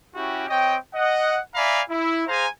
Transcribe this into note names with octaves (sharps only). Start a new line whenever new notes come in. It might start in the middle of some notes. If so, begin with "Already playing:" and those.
C#4 E4 F#4 G4
C4 C#5 D#5 G5
D#5 F#5
D5 E5 F5 G#5 A#5 B5
E4
G#4 C5 F5 G#5 A#5